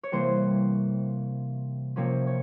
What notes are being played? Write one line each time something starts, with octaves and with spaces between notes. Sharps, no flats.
C#5
C3 E3 G3 A#3 C5
C3 F3 A#3 C#4 C#5
C#5